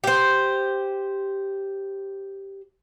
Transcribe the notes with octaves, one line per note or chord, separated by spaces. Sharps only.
G4 C5